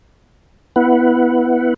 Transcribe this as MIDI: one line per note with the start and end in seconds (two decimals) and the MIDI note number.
0.76 1.74 59
0.76 1.74 64
0.76 1.74 71
0.76 1.74 78